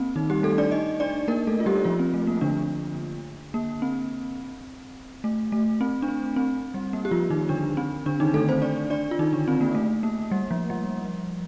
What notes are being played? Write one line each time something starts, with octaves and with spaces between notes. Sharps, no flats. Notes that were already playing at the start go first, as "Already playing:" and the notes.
Already playing: A#3 C4
D#3 D#4
G3 G4
A3 A4
D4 D5
D#4 D#5
D4 D5
A#3 A#4
A3 A4
F4
G3 G4
F3 F4
C4
A3
A#3
D3 D4
A#3
C4
A3
A3
C4
D4
C4
C4
G3
A#3
G4
F3 F4
D#3 D#4
D3 D4
C4
D3 D4
D#3 D#4
A3 A4
C4 C5
D4 D5
D4 D5
F4
D#3 D#4
D3 D4
C4
A#3
A3
A#3
G3
F3
G3